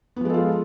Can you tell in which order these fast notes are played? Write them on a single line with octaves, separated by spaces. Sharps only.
B3 F3 G#3 A4 F4